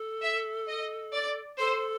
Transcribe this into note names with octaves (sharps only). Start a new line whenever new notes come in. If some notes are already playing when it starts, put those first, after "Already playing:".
Already playing: A4
E5
D#5
D5
A4 C5